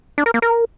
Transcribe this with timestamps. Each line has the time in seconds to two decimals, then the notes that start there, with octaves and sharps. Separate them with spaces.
0.18 D4
0.26 A#4
0.34 A#3
0.42 A#4